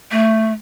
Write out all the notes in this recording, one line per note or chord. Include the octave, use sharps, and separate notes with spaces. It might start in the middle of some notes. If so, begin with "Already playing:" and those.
A3